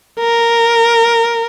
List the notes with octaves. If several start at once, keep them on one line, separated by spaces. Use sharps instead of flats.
A#4